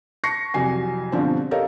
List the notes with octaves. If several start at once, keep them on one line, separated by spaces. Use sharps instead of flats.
A5 C#6 A#6 C7 C#7
C2 F2 F#3 G#5 C7
G2 B2 D3 F3 C4
G4 A4 A#4 C#5 D#5 F5